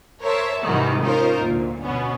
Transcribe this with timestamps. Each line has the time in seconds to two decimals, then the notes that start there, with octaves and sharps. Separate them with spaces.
0.22 A#4 C5 C#5 E5 A5
0.63 G#2 C3 D#3 E3 G3 F#4
1.02 C#4 D#4 F4 A#4 C5
1.40 D2 A#2
1.82 B2 B3 C#4